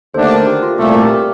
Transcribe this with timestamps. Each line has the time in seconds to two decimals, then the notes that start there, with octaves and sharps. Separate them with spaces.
0.14 D#2 D3 A3 D4 A4 C5
0.30 G4 A#4
0.47 G4
0.63 F4
0.78 C2 A#2 A3 G4
0.94 G4 A#4
1.11 G4